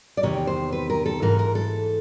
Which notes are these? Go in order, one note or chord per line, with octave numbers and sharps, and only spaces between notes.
D5
E2 C3 D#3 C#5
C5
B4
A#4
A4
G#2 E3 A#4
A#4
A4